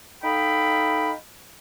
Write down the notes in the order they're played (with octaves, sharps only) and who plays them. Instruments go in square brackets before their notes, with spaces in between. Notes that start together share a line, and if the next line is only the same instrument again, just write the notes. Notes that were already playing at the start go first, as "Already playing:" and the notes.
[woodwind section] D#4 A4 F5 G5 B5